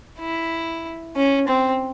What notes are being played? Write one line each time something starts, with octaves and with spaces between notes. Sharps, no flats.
E4
C#4
C4